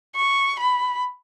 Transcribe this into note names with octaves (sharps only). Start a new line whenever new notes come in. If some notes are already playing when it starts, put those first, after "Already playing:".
C#6
B5